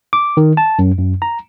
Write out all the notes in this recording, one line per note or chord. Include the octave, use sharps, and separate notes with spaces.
D6
D#3
A5
F#2
F#2
A#5